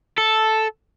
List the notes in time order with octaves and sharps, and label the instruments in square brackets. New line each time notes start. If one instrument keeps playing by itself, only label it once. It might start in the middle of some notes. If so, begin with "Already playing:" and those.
[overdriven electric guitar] A4